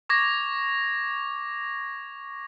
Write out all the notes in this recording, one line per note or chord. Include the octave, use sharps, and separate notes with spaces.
C#6 D6 G#6 A#6